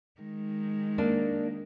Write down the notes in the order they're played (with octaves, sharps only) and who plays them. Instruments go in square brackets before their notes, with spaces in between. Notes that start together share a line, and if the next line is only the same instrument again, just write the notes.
[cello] D#3 G#3
[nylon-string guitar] A#3 D4